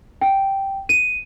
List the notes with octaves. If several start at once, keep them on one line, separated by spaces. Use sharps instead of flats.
G5
D#7